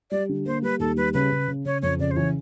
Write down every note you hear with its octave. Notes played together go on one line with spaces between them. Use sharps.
G3 D5
D3
A#3 C5
G3 B4
D#2 A4
G3 B4
C#3 B4
C#3
C#3
C#3 C#5
F2 C#5
C#3 D5
C5
E3 C#5